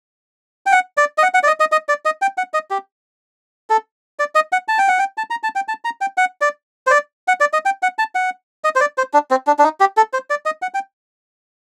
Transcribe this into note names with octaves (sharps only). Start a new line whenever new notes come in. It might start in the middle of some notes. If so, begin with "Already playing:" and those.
G5
F#5
D5
D#5
F#5
F#5
D5
D#5
D#5
D#5
D5
D#5
G5
F#5
D#5
G4
A4
D5
D#5
F#5
A5
G5
F#5
G5
A5
A#5
A5
G5
A5
A#5
G5
F#5
D5
C5
D5
F#5
D5
D#5
G5
F#5
A5
F#5
D#5
C5
D5
C5
D4
C4
D4
D4
D#4
G4
A4
C5
D5
D#5
F#5
G5